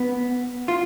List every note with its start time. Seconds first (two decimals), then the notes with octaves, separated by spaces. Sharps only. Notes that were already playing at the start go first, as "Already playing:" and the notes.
Already playing: B3
0.68 F4